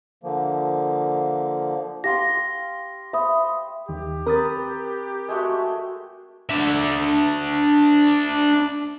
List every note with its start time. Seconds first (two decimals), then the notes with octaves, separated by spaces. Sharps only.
0.23 D3 F3 A#3
2.04 G4 F5 C6 A#6
3.13 C5 E5 B5 D#6
3.89 D#2 D#3 G4
4.26 C4 A#4 B4 D#6 A6
5.28 G#3 A3 F#4
6.49 D4 E5